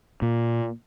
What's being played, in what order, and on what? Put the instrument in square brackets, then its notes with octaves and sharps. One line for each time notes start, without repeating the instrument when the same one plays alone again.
[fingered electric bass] A#2